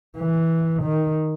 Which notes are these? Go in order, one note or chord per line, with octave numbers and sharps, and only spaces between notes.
E3
D#3